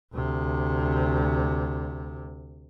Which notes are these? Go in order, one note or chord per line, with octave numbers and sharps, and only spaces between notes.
D2 C3